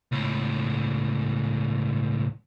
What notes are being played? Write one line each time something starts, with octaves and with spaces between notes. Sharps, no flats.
C#2 A2